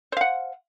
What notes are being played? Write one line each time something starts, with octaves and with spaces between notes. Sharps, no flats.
C5 F5 F#5